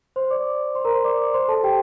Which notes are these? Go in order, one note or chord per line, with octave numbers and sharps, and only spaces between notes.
C5 C6
D5 D6
C5 C6
A#4 A#5
C5 C6
D5 D6
C5 C6
A4 A5
G4 G5